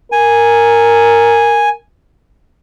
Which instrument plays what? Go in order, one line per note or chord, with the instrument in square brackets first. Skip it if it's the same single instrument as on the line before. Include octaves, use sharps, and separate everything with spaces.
[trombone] A#4 [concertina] G#5